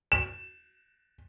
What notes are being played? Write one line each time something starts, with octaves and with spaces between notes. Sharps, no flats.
E7